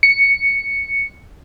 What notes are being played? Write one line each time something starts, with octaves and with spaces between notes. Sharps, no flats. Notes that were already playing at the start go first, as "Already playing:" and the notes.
C#7